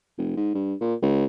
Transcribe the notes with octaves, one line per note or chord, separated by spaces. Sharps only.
F1
G#2
G2
A#2
C#2